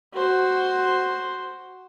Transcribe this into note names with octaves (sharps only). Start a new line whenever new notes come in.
F#4 C5